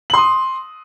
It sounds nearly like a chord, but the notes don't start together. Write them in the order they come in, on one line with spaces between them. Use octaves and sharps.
F#7 C6 D#6